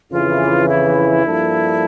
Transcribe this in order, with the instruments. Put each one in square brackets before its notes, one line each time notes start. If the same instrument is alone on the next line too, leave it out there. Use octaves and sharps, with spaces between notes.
[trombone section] F2 C#3 E3 [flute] F4
[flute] E4
[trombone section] G2 F3 A#3 D4 A4